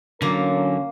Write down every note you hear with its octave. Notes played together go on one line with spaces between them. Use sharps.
D3 F#3 A#3 C#4 A#4